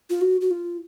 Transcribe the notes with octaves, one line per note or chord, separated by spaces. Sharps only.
F4
F#4
F#4
F4